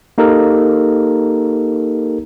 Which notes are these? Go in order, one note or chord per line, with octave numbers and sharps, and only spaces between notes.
A#3 D#4 G4 A4 A#4